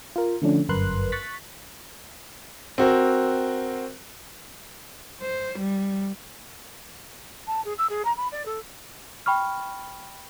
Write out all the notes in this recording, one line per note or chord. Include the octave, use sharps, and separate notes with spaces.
F4 A#4
D3 F3 A3 C#4 D4
G1 F#2 A#4 B4 C6 F#6
C#6 F#6 A6 B6
C4 F#4 A#4
C5
G3
A5
G#4
E6
G#4
A#5
B5
D5
A4
G5 B5 C#6 F6